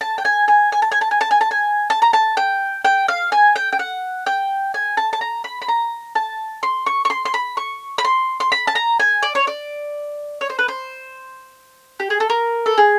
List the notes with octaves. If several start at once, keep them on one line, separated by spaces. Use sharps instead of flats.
A5
G5
G#5
G#5
G#5
A5
G#5
A5
G#5
A5
G#5
A5
G#5
A5
A#5
A5
G5
G5
F5
G#5
G5
G5
F#5
G5
G#5
A5
A5
A#5
B5
B5
A#5
A5
C6
C#6
C#6
C6
C6
B5
C#6
B5
C6
C6
B5
A5
A#5
G#5
D5
C#5
D5
C#5
C5
B4
C5
G4
G#4
A4
A#4
A4
G#4